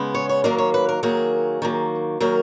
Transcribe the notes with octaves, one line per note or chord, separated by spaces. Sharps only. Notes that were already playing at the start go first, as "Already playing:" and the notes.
Already playing: C#3 G#3 B3
C#5
C#5
D#3 F#3 A#3 A#4
C#5
B4
A#4
D#3 F#3 A#3 G#4
D#3 F#3 A#3
D#3 F#3 A#3 A#4